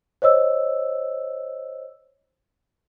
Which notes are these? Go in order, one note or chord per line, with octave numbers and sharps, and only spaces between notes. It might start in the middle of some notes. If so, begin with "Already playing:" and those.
C5 C#5 D#5 E6